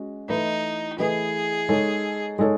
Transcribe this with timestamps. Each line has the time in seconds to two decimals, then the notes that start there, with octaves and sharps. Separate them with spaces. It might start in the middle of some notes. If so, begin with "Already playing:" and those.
Already playing: G#3 C#4 F#4
0.28 E3 A3 D#4 E4 B4 D#5
0.98 E3 A3 E4 G#4 B4 D#5
1.69 G#3 D#4 A4 C#5
2.39 G#3 D#4 A4 C#5